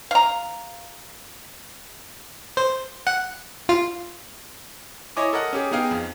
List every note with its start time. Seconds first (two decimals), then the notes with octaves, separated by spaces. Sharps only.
0.11 F5 A#5
2.57 C5
3.07 F#5
3.69 F4
5.17 E4 C#5 D#5 G#5 D6
5.33 A4 A#4 D#5 F#5
5.53 C#4 G4 G#4
5.71 B3 D#4 G#4 F5 G5
5.91 F2